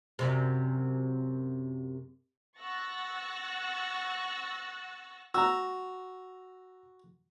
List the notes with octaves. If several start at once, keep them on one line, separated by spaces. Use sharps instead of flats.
F#2 C3
F#5 C#6 E6 F#6 A6 A#6
F#4 A#5 E6